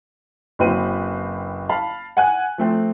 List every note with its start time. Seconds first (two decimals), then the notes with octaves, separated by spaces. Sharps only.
0.59 F#1 F#3 C4 B4 D#7
1.69 F5 A5 B5
2.17 F#5 G#5 F#6
2.58 F3 A3 C4